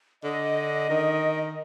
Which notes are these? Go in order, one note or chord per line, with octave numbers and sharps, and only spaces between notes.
D3 D#5
D#3